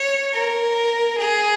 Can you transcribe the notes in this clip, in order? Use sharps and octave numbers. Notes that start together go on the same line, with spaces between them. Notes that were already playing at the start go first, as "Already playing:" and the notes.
Already playing: C#5
A#4
G#4